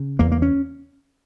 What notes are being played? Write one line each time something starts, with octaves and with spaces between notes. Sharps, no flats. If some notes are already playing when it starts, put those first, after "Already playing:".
Already playing: C#3
E2 A#3
A#3
C#4